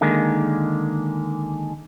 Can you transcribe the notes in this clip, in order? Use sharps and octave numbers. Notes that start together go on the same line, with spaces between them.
D3 D#3 G#3 A#3